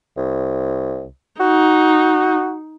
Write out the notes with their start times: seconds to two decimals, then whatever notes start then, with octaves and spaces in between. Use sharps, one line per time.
0.17 C2
1.40 D#4 F#4